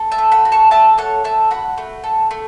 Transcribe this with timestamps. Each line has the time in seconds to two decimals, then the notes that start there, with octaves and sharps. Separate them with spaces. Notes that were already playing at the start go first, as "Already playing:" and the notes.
Already playing: A4
0.12 E5 A5
0.18 A3
0.31 F#5 B5
0.45 F#4
0.52 A5 C#6
0.71 A3 E5 A5
0.98 A4 C#5 F#5
1.24 A3 E5 A5
1.51 F#4 F#5 B5
1.78 A3
2.04 A4
2.31 A3